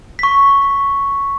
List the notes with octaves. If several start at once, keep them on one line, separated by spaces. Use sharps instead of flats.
C#6 B6